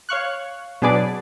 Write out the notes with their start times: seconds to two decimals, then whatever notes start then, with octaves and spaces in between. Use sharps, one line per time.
0.09 C#5 F5 C#6 F#6
0.82 B2 F#3 D4 G#4 B4 D5